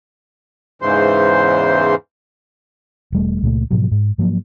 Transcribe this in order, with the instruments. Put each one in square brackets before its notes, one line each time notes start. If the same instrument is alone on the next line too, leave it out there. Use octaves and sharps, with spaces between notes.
[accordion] E2 G#2 C#3 E3 C5
[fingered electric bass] E1 G3 A3
C#2 A#2 G3 A3
G#2 B2 F3 F#3
G#2
G#2 F3 F#3 A#3